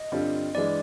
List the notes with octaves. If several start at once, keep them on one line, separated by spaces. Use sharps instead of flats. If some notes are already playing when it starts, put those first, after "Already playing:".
Already playing: D#5
G2 D3 G3 C4 F4
G2 E3 G#3 D5